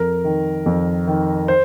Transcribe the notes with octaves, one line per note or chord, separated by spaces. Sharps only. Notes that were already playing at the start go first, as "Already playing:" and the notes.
Already playing: F2 A#4
D#3
F2
D#3
C5